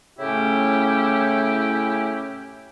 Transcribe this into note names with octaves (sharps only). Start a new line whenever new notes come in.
A2 C#3 A3 C#4 E4 G4